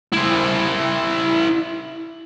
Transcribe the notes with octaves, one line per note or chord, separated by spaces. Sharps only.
E4 C5